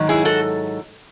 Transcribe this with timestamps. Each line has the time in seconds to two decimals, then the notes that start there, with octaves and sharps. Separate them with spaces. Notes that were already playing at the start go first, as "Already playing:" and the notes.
Already playing: G#2 D#3 F#3
0.09 E4 G#4
0.25 F#4 A4